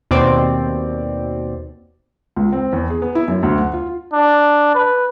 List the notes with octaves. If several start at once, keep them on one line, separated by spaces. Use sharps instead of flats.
D#2 B2 C4 D5
C#2
C4
E2
G#4
B3
E4
F#2
D2
F#5
F4
D4
B4